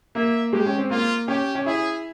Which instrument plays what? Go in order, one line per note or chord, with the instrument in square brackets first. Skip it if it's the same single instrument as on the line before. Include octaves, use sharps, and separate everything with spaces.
[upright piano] A#3 [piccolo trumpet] E5
[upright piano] G#3 [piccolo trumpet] G4
[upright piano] C#4
C4
[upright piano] A#3 [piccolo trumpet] F4
[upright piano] C#4 [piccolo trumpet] G4
[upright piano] C#4
[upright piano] E4 [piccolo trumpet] G#4